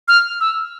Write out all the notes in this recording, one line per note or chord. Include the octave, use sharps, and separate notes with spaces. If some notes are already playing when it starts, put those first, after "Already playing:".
F6
E6